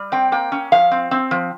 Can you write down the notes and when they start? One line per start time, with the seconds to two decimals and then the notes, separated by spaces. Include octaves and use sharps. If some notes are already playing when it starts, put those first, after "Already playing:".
Already playing: G3
0.12 C4 G5
0.32 A#3 G5
0.52 C#4
0.72 F3 F5
0.91 C4
1.11 C4
1.31 F3